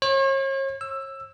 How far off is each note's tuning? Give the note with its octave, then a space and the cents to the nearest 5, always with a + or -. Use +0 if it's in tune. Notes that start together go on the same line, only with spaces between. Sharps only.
C#5 -40
E6 +10